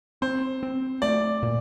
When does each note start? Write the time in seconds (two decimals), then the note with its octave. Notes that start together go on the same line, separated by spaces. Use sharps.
0.22 C4 C5
0.63 C4
1.02 A3 D5
1.43 A#2